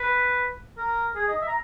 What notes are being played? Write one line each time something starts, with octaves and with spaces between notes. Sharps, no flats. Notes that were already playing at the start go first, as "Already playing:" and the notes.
Already playing: B4
A#4
G#4
D#5
E5
A#5